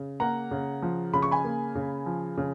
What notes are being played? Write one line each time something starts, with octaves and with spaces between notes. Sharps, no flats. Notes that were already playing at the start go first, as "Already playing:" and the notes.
Already playing: C#3
A#3 F#5 A#5
C#3
F3
C#3 B5
C#6
G#5 B5
A#3
C#3
F3
C#3